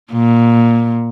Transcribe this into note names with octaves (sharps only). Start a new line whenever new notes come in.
A#2